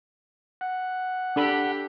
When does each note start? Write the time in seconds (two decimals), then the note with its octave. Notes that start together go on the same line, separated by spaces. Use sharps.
0.61 F#5
1.36 D4 G4 A4 B5